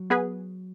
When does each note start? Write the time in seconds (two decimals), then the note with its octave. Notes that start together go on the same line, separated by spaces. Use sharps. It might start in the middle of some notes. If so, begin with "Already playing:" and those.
Already playing: F#3
0.10 B3 G#4 B4